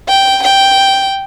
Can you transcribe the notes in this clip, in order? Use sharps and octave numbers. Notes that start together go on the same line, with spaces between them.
G5
G5